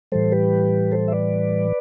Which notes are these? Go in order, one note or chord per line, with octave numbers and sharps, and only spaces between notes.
A2 E3 G3 A4 C5
G4 B4
A4 C5
E5
B4 D5